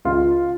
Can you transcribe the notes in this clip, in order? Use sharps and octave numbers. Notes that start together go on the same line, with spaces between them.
C#2 F4